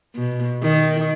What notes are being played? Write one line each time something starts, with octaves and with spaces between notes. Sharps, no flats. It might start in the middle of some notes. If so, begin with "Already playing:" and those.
B2
D#3